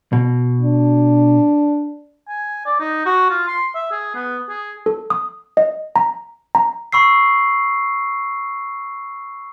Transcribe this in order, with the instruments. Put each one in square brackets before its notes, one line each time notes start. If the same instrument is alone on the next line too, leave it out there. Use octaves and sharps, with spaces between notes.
[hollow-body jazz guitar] B2
[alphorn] D4
[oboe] G#5
D5
D#4
F#4
F4
C6
E5
G#4
B3
G#4
[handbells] A4
D#6
D#5
A#5
A#5
[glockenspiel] B5 C#6 E6 C7